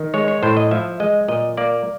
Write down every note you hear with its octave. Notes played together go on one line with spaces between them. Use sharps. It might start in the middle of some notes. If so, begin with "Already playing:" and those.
Already playing: D#3
G#3 C#5
C#5
A2 C5
D#5
F3 E5
G#3 D#5
A#2 D#5
A#3 D5